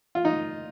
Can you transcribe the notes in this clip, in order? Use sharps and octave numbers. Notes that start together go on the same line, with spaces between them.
F4
D#4